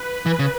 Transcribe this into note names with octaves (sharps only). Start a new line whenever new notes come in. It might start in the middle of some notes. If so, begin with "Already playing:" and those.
Already playing: B4
E3
C#3